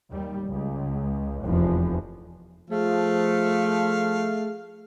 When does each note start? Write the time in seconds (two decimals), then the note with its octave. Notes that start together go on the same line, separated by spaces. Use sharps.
0.11 D#2 G3
0.47 C#2
1.42 F1 E2 F3
2.70 F3 A3 G#4 F5